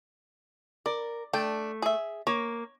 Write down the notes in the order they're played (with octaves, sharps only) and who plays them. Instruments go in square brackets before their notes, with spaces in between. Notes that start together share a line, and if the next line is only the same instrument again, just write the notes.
[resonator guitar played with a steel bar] A#4 [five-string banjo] D5
[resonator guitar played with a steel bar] A3 [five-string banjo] D4 G5
[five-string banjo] G#4 E5
[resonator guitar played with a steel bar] A#3 [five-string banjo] C#5